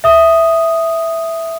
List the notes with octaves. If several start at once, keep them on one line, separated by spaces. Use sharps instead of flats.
E5 D#6